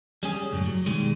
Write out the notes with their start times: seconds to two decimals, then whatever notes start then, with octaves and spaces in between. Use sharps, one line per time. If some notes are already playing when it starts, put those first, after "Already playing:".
0.23 G3 C#4 G#4
0.51 C#2 F#2 A2
0.66 F#3
0.86 B2 D#3 G3 G#3